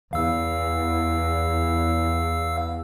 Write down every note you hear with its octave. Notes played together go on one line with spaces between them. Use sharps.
E2 F5 E6